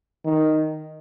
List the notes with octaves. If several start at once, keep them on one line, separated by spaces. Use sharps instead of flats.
D#3